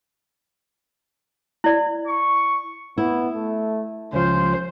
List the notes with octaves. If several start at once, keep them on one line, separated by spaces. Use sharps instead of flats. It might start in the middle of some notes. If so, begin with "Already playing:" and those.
E4 D5
C#6
B3 E4
A3
C#2 F3 C#4 C5